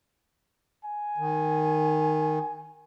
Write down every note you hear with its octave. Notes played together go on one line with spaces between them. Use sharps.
G#5
D#3